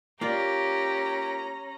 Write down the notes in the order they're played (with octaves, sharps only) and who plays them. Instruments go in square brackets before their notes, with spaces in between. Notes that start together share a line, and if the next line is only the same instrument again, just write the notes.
[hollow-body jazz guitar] A#3 F4 D5 [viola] C#4 A#5 [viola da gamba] G4